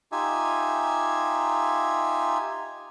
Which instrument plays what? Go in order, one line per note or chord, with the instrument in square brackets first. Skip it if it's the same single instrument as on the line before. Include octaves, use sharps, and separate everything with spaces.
[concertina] D#4 F4 G4 E5 G#5